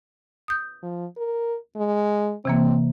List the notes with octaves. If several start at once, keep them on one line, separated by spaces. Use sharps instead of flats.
D#6 G6
F3
A#4
G#3
C3 E3 A#3 C4